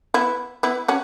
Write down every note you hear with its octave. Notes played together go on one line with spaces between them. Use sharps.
B3 E4
B3 E4
C#4 F#4